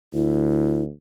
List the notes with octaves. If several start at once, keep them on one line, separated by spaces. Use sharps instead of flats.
D2 E4